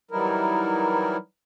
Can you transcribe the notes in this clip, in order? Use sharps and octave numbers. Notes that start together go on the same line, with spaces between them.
E3 F#3 G3 D#4 E4 A#4